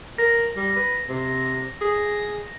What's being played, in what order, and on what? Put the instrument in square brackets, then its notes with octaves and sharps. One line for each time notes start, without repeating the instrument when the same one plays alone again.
[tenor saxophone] A#4 [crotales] A#6
[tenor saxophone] G3
B4
C3
G#4